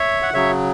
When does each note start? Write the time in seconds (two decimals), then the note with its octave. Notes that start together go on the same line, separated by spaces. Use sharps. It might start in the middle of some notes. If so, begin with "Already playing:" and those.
Already playing: C#5 E5
0.22 F#5
0.34 C#3 F#3 C#5 E5